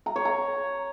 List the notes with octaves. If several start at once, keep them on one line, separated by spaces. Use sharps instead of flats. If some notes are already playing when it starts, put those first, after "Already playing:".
A#5
C#5
A#5